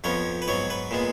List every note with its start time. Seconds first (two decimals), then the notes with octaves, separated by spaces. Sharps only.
0.04 F2 F3 B3 C#5
0.42 B4
0.48 G#2 F#3 B3 C#5
0.70 B4
0.91 A#2 G#3 B3